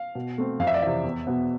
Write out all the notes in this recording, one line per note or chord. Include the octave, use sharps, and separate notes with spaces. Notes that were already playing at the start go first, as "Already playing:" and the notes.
Already playing: F5
B2
A3 C4
F2 F5
E5
D5
C3 E3 E5
E2
B2 B3